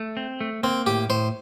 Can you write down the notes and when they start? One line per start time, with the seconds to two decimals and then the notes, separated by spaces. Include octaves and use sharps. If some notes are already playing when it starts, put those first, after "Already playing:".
Already playing: A3
0.17 C4
0.41 A3
0.63 A#3 C4
0.86 A2 G4
1.10 A2 C5